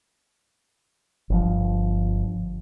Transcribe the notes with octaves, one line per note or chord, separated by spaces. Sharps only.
G1 F3